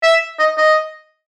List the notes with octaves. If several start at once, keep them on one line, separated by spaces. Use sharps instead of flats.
E5
D#5
D#5